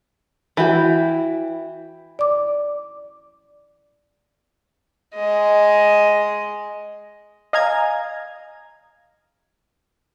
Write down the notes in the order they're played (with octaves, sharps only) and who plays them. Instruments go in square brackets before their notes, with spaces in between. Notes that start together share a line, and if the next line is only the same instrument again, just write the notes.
[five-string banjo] E3 F#4 [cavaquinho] E4 G5
[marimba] D5 D6
[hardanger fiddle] G#3 D#5
[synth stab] D#5 F5 G#5 A#5 G#6